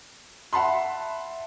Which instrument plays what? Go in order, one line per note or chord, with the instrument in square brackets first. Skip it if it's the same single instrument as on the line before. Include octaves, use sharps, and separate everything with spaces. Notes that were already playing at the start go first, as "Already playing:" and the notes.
[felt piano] E5 F#5 A5 B5 C6